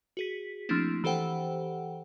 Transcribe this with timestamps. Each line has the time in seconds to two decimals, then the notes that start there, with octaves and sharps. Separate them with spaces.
0.17 F#4 G#4 B6
0.69 F3 A3 A#3 C4 D4 E4
1.04 E3 G4 A4 C5 F#5 G5